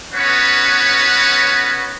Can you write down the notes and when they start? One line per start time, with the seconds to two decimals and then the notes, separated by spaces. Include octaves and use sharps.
0.14 B3 C#4 F#4 B4 C#5